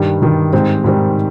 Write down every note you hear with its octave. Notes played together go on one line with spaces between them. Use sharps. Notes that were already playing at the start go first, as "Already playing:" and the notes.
Already playing: G2 D#3 G3
G2 D#3 G3
G#2 D#3 G3 C4
G#2 D#3 G3 C4